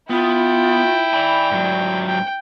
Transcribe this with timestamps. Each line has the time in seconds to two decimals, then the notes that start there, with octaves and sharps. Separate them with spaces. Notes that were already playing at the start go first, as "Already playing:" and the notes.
0.10 B3 E4 F4 G5
1.13 D5 G#5 B5
1.51 G#2 F#3
2.07 G5